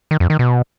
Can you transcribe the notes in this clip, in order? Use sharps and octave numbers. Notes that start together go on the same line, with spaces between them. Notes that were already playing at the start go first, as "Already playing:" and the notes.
D#3
F2
D#3
B2